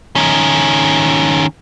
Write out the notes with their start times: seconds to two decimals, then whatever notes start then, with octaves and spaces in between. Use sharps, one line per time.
0.16 D#3 C#4